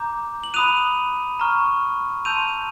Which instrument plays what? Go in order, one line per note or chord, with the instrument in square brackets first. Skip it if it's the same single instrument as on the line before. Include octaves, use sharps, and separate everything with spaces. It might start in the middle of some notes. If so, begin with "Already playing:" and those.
Already playing: [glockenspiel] A#5 D6 G6
F#7
B5 D#6 F#6 D#7 F7
A#5 C#6 F6
A5 C6 E6 G6 D#7 F7